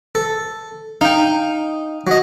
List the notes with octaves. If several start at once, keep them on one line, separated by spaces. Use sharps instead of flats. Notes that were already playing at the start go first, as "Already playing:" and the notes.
A4
D#4 F5 G5
F#3 D#5